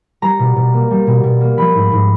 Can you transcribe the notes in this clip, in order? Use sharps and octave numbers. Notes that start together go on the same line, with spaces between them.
G3 A#5
B2
B2
A#3
G3
B2
B2
A#3
F3 B5
G#2
G#2